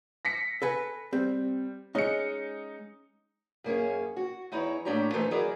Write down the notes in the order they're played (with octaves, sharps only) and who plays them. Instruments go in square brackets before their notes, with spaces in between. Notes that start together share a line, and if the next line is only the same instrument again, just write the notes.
[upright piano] A#6 B6 C#7
[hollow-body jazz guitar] A4 B4 G#5
[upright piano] G3 [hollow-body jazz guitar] C4
[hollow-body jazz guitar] G#3 C#4 [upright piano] D#4 C#7
[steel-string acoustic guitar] F#2 A#3 C#4 G#4
F#4
E2 D#4 E4 C#5
A2 A#3 D4 G4 C#5 A#5
E3 A3 D#4 A4 B4 C5
D#3 F#3 E4 G#4 A#4 D5